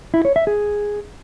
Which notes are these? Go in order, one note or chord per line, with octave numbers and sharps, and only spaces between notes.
E4
C#5
E5
G#4